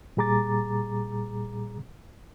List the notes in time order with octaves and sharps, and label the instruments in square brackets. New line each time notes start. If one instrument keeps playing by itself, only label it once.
[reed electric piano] A#2 G3 G#4 A#5 D6 A6